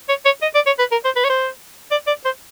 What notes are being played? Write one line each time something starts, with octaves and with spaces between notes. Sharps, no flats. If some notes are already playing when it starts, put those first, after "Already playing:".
C#5
C#5
D#5
D5
C#5
B4
A#4
C5
B4
C#5
C5
D5
D5
C5